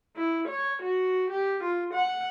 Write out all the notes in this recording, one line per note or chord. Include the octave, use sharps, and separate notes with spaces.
E4
C#5
F#4
G4
F4
F#5